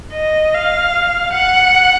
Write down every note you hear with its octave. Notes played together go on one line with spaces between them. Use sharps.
D#5
F5
F#5